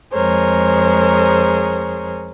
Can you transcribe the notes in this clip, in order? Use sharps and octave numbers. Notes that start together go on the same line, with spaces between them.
F2 G#3 G#4 A#4 C5 C#5